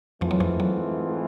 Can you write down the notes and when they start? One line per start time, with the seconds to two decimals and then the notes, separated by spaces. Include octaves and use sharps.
0.21 F2 G#2 E3 F3 A3 C4 F4
0.31 F#3
0.40 F2 F3
0.60 F#3